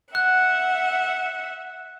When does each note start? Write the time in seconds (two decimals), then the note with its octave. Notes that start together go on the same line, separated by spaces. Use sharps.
0.15 E5 F#5 F#6